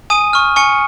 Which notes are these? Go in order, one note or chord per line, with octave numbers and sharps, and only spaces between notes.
G#5 D#6 D#7
C#6 F6
G#5 C#6 C#7